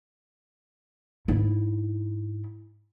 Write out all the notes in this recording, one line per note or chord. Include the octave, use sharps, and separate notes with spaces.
G#2 E4